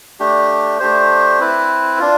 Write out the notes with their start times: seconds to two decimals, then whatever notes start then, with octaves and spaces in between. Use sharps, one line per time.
0.20 A3 D4 G4
0.80 A3 D4 G4 C5
1.39 C4 E4 B4
1.99 D4 F4